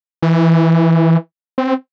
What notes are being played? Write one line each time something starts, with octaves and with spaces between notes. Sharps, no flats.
E3
C4